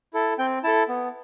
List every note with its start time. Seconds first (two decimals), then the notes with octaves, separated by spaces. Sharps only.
0.14 E4 A4
0.39 C4 G5
0.64 E4 A4 A5
0.88 B3